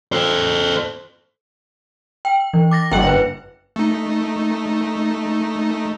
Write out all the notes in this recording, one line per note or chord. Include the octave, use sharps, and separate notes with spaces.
A4 C5
G5
E3
D6 A6 A#6
G1 F#5 G5
B4
A3 D#4